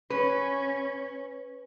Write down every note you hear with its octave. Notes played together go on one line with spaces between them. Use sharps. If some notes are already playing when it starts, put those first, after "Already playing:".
C#4 B4